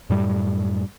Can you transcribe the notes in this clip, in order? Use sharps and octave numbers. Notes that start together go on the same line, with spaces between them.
F#2 A2 G3